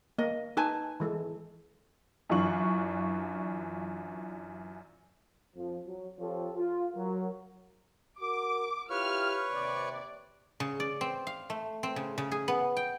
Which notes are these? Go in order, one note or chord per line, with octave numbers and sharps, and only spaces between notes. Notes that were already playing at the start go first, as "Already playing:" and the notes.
A#3 D#5
D#4 B4 G#5 A5
E3 G#3 A4
F#2 E3 D4 F4 C#6 F#7
F2 F3
F#3
F3 C4 F4 G4 A4 C#5
F4
F#3 A#4
F#4 A#4 D6
E4 F4 G4 B4 C#5 C#6 F6
D#2 C3 D5
C#3
D5
C4
F5
A3
C4
C#3
C#3
G#4
B3
G5